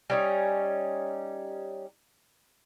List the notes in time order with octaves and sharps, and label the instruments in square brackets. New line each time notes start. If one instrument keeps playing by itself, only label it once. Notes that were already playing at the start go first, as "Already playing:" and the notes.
[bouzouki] G3 C#4 D#4